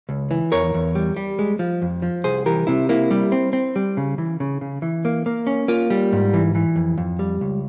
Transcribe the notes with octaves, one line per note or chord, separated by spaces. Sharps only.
C#2
E3
E2 A#4 C#5
E2
G3
G3
G#3
F3
F2
F3
C2 G#4 C5
E3 G4 A#4
C3 E4
A#3 E4
G3
C4
C4
G3
C#3
E3
C#3
C#3
E3
A#3
A#3
C#4
A#3 F4
G3
G#2
E3
E3
F2
F2
G3
C#2